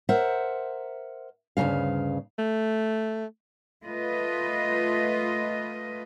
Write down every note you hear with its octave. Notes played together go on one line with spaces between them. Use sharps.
A#4 C5 E5 F#5
D2 G2 A#2 C#3 F5
A3
A3 F4 B4 D#5